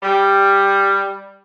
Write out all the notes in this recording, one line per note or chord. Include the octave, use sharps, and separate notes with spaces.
G3